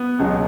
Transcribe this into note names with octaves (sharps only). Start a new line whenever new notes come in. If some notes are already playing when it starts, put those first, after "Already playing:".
Already playing: B3
C#2 B2 F#3